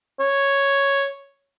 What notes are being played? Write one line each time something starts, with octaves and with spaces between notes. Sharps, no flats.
C#5